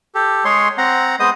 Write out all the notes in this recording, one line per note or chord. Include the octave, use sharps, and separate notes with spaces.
G4 A4
G#3 G#4 C#5 C6
C4 F#5 A#5
G#3 B3 C5 D#5 D#6